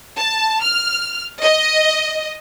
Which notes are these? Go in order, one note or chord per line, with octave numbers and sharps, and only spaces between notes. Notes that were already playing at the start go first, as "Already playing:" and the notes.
A5
F6
D#5